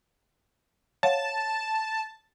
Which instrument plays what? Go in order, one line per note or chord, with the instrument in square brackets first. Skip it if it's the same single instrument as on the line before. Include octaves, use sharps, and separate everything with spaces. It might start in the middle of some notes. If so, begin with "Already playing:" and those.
[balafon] C#5 F5 F#5 [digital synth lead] A5